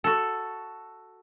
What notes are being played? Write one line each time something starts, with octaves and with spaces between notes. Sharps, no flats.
F#4 A4